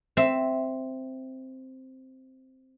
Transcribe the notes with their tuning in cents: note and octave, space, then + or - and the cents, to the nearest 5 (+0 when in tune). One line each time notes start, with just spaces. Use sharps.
C4 +0 E5 +0